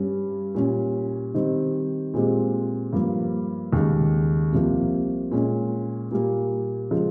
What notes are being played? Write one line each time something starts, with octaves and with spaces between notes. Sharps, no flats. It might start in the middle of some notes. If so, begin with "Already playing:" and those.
Already playing: G2 G3 C#4
A#2 G3 C#4
D#3 G3 C4
A#2 G#3 C4 G4
G2 F3 A#3
D#2 C#3 G#3
C2 C3 F3 A#3
A#2 G#3 C#4
A#2 G3 A#3
C#3 F3 G#3